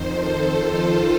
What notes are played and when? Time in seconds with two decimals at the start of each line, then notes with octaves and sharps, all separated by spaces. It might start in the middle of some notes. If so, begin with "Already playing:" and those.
Already playing: F2 D#3 C5
0.09 A4
0.59 F4